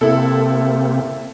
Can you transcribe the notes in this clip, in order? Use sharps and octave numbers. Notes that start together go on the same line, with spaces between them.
C3 A#3 C4 E4 A4